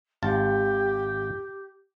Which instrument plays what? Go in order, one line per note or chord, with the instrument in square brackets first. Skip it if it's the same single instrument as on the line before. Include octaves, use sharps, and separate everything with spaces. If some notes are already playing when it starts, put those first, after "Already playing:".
[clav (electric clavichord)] G#1 F4 A5 [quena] G4